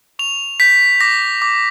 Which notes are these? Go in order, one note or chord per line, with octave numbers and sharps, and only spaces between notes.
C#6 F7
G6 B6
D6 A#6
D6